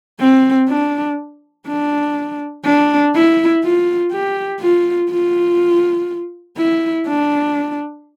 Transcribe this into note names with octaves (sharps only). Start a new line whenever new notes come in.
C4
D4
D4
D4
E4
F4
G4
F4
F4
E4
D4